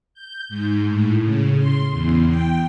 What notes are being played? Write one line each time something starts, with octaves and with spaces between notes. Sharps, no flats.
G6
G#2
A2
C#3
C6
E2
G5